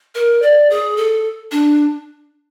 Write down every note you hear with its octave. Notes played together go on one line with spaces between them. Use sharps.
A#4
D5
G#4
A4
D4